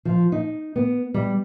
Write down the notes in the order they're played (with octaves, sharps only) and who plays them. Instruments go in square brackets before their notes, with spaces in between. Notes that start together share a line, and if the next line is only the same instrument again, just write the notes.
[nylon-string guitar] F3
D#4
B3
G3